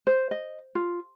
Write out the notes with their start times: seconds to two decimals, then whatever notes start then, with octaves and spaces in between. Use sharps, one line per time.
0.07 C5
0.31 D#5
0.75 F4